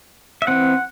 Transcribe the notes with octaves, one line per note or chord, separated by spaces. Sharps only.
E5
E3 C4 F#5